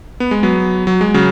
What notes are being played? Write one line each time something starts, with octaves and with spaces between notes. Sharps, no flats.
B3
G#3
F#3 B3
F#3
G#3
C#3 F#3